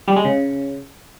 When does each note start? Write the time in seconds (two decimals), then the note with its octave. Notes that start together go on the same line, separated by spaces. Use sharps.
0.08 G3
0.16 G#3
0.25 C#3